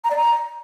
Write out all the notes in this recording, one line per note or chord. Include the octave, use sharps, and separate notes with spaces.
A#5
D5
A#5